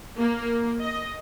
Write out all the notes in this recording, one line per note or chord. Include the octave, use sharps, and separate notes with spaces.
A#3
D#5